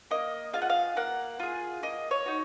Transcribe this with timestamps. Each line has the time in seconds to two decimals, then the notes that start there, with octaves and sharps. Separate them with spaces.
0.11 A#3 D#5
0.53 F4 G#4 F5
0.62 F#5
0.70 F5
0.96 A#3 F#5
1.40 F4 G#4
1.83 A#3 D#5
2.11 C#5
2.26 D#4 F#4